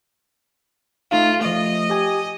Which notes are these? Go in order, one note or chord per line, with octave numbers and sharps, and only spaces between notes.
A3 D#4 F4 F5
F3 A3 D#5
G4 G#5